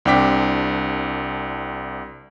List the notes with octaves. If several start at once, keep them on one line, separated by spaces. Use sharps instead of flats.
C2 C4 D4 G5 D6 B6